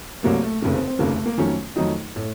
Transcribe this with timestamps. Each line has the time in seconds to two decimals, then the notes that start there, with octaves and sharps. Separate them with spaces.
0.23 C2 C3 F#3 A3 A#3
0.43 A3
0.61 F1 D#2 C#3 A3
0.74 C4
0.87 C4
0.99 F1 D#2 C#3 A3 A#3
1.12 A3
1.26 A#3
1.37 F2 D#3 F#3 A3 C#4
1.76 F2 D#3 F#3 A3 D#4
2.16 A2 A3